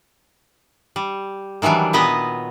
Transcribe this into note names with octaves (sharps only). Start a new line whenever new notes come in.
G3
D#3 E3 F#3 G3 D4
A#2 F#3 B3 B4 D#5